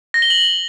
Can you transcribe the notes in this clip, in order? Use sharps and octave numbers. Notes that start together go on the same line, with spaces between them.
A#6
G7
F#7